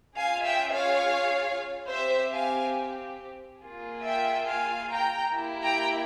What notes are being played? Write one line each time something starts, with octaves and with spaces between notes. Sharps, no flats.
C#4 F4 G#4 F5 G#5
E5 G5
C#5 F5
C4 G4 C5 E5
F5 G#5
A#3 F4 G#4
E5 G5
F5 G#5
G5 A#5
A#3 E4 G4
G5 A#5